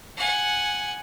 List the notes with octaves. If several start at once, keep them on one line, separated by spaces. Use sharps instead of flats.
F#5 G#5